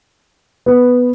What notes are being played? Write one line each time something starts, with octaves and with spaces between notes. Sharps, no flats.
B3